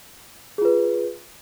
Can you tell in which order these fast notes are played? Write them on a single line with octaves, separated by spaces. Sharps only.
G#4 F4 B4